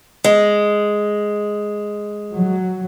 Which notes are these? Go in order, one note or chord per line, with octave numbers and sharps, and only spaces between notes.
G#3
F#3